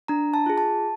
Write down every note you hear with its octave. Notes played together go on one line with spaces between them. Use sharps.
D4 A#5
A5
F4 G#4
A5